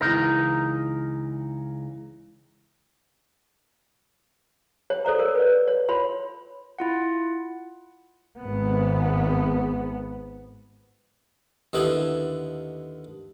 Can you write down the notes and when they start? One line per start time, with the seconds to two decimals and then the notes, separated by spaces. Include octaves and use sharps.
0.01 C#2 E3 D#4 A#4 A#6
4.90 C#5
5.05 A4 C5 D5 A#5
5.19 A#4 C#5
5.35 B4 D5
5.68 C#5
5.89 F4 C#5 B5 C6
6.79 E4 F4 F#5
8.40 G#1 G#2 B3
11.73 D#2 D3 B3 E4